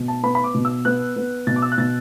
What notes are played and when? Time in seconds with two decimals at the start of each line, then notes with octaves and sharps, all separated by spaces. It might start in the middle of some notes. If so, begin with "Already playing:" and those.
Already playing: B2
0.08 A5
0.23 B3 B5
0.35 B5
0.44 D6
0.55 B2
0.65 E6
0.85 B3 F#6
1.16 B3
1.47 B2 A6
1.56 D6
1.62 E6
1.72 F#6
1.78 B2 A6